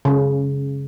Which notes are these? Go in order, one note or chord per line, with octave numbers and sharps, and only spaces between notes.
C#3